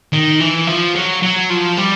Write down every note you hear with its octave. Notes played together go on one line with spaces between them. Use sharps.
D#3
E3
F3
F#3
F#3
F3
G3